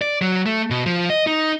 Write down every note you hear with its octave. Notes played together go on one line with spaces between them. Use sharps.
D5
F#3
A3
B2
F3
D#5
D#4